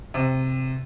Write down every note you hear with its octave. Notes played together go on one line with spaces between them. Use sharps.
C3